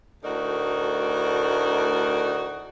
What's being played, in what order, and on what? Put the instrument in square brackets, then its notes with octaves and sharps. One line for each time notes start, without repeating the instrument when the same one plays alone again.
[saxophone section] D2 A2 D#4 F#4 A#4 D5